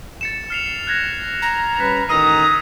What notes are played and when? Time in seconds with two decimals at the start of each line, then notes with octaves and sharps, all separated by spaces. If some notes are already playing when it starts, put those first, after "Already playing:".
0.21 A6 C#7 E7
0.50 F6 C7 F7
0.87 F#6 G#6 A#6
1.42 A#5 A#6
1.80 G3 C#4 B4 F#6 B6
2.09 A1 D#3 A#5 D#6 E6 C7 D#7